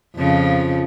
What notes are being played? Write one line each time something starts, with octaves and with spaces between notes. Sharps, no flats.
F2 C#3 F3